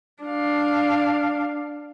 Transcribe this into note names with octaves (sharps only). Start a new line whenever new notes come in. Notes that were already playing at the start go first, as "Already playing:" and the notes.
D4 F5